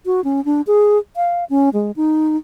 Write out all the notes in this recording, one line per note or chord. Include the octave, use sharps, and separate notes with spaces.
F#4
C#4
D4
G#4
F5
C#4
G#3
D#4